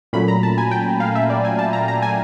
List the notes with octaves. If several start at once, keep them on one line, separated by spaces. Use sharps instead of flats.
A#2 F#3 A3 C#4 B5
A#5
A5
G#5
G5
F5
E5
D5
G#5
A5
A#5
A#5
G#5